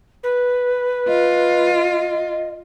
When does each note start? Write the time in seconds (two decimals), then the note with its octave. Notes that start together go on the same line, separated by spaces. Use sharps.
0.23 B4
1.08 F4 D#5